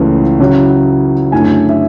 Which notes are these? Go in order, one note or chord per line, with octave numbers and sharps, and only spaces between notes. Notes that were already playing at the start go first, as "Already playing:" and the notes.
Already playing: C#2 C#3 E3 A3
C#3 F#3 C#4 E4
F#2 D3 A3 E4 G#5
E5